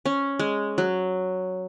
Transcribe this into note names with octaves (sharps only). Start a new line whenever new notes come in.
C#4
G#3
F#3